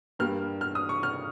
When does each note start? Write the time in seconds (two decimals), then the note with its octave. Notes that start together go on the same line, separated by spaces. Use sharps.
0.19 G2 G3 A#3 F6
0.61 F6
0.75 D#6
0.89 C#6
1.03 F6